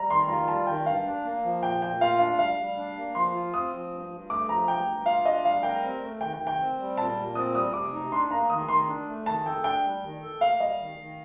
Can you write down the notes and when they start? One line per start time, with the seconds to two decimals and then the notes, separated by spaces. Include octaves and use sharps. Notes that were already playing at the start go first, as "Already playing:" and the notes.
Already playing: G3 A#5
0.10 D#3 C6
0.28 F4 A#5
0.48 G3 A5
0.67 D#3 G5
0.86 G2 F5
1.05 D4
1.24 A#3
1.44 F3
1.63 A#2 G5
1.82 A#2 G5
2.01 F4 F5
2.19 D4 F5
2.39 G3 F5
2.58 G3
2.77 D4
2.97 A#3
3.15 F3 C6
3.34 F4
3.54 C4 D#6
3.73 F3
3.91 G2
4.11 G2
4.30 A3 D6
4.49 F3 A#5
4.68 G2 G5
4.88 G2
5.06 F4 F5
5.26 D4 D#5
5.45 G3 F5
5.63 A#4 G5
5.82 C4
6.02 A3
6.21 D#3 G5
6.33 G5
6.40 D#3
6.47 G5
6.59 C4
6.78 G3
6.97 A#2 A5
7.16 A#2
7.35 C4 D#6
7.55 G3 D#6
7.73 C3 D6
7.92 D#4
8.12 D4 C6
8.31 A#3 A#5
8.50 D#3 D#6
8.68 D#3 C6
8.88 D4
9.07 A3
9.26 D#3 A5
9.46 A4 G5
9.64 D4 G5
9.84 G3
10.03 D#3
10.22 A4
10.41 A#3 F5
10.60 G3 D#5
10.79 D#3
10.98 D#3